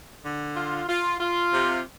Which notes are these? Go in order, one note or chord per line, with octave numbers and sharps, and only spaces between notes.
D3
F4
F4
F4
C3